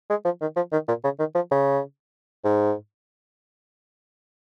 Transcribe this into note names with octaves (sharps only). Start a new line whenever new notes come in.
G#3
F3
D#3
F3
D#3
A#2
C#3
D#3
F3
C#3
G#2